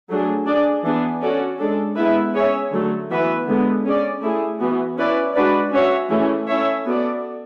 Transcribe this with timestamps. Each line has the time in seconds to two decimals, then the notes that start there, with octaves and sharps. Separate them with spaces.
0.09 F#3 A3 D4 G#4
0.46 D4 G#4 D5
0.84 E3 B3 D4 G#4
1.21 C#4 F#4 A4 D5
1.59 G#3 D4 A4
1.96 G#3 B3 E4 B4 E5
2.34 C#4 G#4 C#5 E5
2.71 D3 F#3 A3
3.09 E3 B3 F#4 B4 E5
3.46 D3 G#3 B3
3.84 C#4 G#4 D5
4.22 A3 E4 G#4
4.60 E3 B3 F#4
4.97 C#4 E4 B4 D5
5.35 G#3 D4 F#4 B4 D5
5.72 C#4 F#4 C#5 E5
6.10 E3 A3 C#4 E4 G#4
6.47 C#4 E4 A4 C#5 E5
6.85 B3 F#4 A4 D5